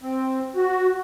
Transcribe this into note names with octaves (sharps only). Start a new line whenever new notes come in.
C4
F#4